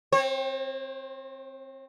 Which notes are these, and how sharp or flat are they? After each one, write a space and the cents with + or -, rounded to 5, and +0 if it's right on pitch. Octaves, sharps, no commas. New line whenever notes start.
C4 +10 C#5 -45